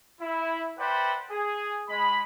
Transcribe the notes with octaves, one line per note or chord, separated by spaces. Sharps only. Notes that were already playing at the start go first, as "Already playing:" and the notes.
E4
B4 C5 D5 E5 F#5 G5
G#4
G#3 B5